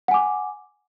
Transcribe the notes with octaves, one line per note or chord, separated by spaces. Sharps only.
F#5 G#5 D6